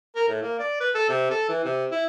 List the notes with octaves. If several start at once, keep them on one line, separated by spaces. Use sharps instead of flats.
A#4
A2
A#3
D5
B4
A4
C3
A4
E3
C3
E4